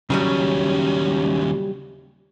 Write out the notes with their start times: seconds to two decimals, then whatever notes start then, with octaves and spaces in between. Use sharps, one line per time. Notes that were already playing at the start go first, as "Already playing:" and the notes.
0.10 D#2 C#3 F#3 G3 C#4